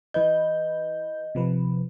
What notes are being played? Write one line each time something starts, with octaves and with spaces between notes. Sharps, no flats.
E3 B4 D#5 G6
C3 F3 B4